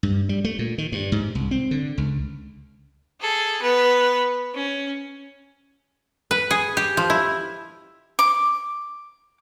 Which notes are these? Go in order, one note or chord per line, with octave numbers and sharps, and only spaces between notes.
G2
G3
A3
A#2
D#3
G2
G#2
C2
C4
D3
C#2
G#4 A4
B3 B4
C#4
B4
G#4
G4
F3
E4
D6